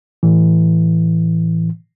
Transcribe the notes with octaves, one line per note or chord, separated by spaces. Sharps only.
A2 E3